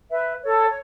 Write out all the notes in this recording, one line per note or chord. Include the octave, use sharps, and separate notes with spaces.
B4 E5
A4 C#5
C#5